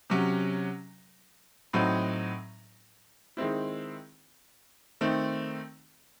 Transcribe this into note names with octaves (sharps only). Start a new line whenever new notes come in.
C3 F#3 C#4
A2 F#3 C4 D#4
D#3 G#3 C4 E4
D#3 A3 C4